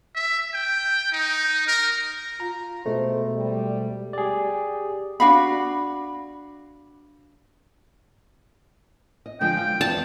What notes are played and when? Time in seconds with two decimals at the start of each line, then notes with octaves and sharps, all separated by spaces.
0.15 E5
0.54 G5
1.12 D#4
1.67 A#4
2.40 F4 A#5
2.86 B2 G#3 A3 C5
3.35 G3
4.13 G4 G#4 D5
5.20 D4 F#4 F5 B5
9.26 D#5
9.41 D3 F3 G#3 G5
9.57 F4 F5
9.81 E2 D5 A5